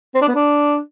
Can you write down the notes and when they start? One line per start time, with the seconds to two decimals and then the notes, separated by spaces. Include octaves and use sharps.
0.15 C4
0.21 D4
0.28 B3
0.35 D4